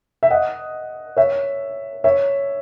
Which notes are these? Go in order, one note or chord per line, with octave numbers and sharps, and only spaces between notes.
E5
D#5 F#5
C#5 E5
C#5 E5